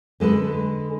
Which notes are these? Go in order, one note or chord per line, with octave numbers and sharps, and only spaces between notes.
D3 G#3 A4 B4